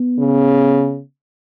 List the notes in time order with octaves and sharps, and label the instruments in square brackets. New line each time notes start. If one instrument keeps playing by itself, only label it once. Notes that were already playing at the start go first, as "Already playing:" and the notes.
Already playing: [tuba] B3
[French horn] C#3